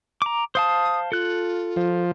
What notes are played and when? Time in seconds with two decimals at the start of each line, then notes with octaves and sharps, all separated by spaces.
0.22 A#5 D6
0.55 C5 F5 A5 D#6
1.12 F4 A4 F#6
1.76 F3